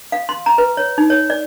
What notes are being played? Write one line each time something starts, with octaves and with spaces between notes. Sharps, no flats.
F5
C6
A#5
B4
C#5
D#4
C#5
D5